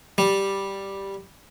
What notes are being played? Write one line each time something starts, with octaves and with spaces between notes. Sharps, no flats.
G3